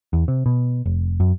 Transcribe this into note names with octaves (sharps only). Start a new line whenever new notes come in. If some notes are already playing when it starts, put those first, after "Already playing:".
E2
C3
B2
F1
F#2